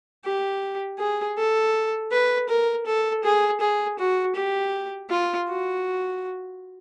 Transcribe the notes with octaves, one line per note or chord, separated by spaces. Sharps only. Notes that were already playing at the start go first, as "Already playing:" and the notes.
G4
G#4
A4
B4
A#4
A4
G#4
G#4
F#4
G4
F4
F#4